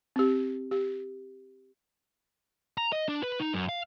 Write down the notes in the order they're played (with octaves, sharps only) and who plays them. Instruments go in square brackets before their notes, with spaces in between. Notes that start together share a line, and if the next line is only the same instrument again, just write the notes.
[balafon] C4 G4
G4
[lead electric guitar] A#5
D#5
D4
B4
D#4
F#2
F5